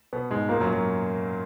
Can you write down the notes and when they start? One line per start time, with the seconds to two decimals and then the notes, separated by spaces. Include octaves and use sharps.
0.13 B2 B3
0.31 G#2 G#3
0.49 A#2 A#3
0.60 F#2 F#3
0.73 F#3